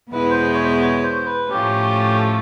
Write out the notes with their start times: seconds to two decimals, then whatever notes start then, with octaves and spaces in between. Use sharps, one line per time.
0.12 E2 B2 G#3 B3 E4 B4
0.30 C5
0.54 C#5
0.63 C5
0.81 C#5
1.03 C5
1.26 B4
1.49 A2 F3 A3 C#4 G4
2.18 A4